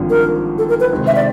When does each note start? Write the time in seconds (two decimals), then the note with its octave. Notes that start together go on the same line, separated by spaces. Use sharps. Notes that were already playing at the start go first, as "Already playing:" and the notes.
Already playing: G#1 G2 D3 F3
0.10 A#4
0.58 A4
0.69 A#4
0.80 B4
0.92 C3 D#3 G#3 C4
1.07 E5
1.16 D5